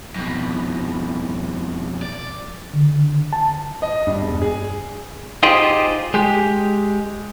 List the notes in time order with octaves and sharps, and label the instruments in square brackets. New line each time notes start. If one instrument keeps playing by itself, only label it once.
[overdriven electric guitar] F2 B2
D5
[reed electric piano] D3
A5
[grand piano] D#5
G2
E1
G#4
[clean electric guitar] D#4 F4 G4 G#4 C5 D#5
G#3 G4